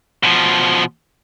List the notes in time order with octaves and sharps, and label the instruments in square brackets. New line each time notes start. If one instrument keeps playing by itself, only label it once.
[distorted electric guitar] B2 F3